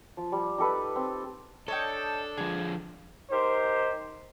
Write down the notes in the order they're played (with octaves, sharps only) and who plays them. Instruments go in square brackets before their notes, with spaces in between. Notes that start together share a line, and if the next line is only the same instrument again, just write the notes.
[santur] F3
G3
D#4 G4 A4 B4
C4
[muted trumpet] D4 [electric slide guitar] A4 [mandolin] C#5 D#5 G5
[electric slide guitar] D3 F3 [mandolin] G#4
[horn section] D#4 G4 A#4 C5